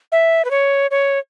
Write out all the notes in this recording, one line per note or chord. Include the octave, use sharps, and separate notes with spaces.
E5
B4
C#5
C#5